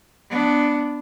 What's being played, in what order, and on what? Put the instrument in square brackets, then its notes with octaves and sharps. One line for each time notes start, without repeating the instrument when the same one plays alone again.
[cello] B3 D4